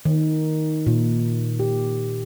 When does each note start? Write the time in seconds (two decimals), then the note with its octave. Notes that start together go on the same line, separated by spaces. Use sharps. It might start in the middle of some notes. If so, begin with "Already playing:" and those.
0.05 D#3
0.87 A#2
1.60 G4